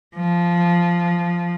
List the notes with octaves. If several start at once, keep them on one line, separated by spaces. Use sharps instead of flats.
F3